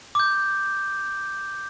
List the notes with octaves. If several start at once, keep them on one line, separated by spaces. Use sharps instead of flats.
D6 G6